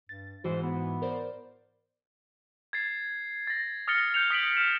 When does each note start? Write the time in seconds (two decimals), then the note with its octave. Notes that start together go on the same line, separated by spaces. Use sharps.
0.09 G2 A6
0.44 G#2 E3 F#4 C5
0.63 B3
1.02 A#4 C5 D5
2.73 G#6 A6 C7
3.47 A6 A#6
3.88 D#6 F6 A6 A#6 C#7 G7
4.14 G6 C#7 F7
4.31 D#6 B6 D7 F#7
4.57 F6 E7